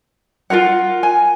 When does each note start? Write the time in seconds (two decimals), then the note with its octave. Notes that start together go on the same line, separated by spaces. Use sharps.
0.50 F4 F#4 A#4 F#5
1.03 G#5